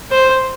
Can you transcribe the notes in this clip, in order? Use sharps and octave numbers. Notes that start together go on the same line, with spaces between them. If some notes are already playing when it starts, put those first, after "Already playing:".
C5